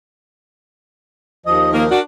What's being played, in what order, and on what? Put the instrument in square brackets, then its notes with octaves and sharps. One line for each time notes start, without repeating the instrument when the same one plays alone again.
[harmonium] D#2 F3 D#5 [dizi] D#6
[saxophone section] D#3 A#3 [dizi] A#4
[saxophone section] D4 F#4